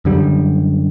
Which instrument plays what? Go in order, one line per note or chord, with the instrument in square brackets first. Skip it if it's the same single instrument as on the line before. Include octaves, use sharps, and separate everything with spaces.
[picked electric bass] F#2 D3 G3